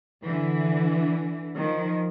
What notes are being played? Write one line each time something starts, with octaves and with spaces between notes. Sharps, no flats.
D3 E3
D#3 F3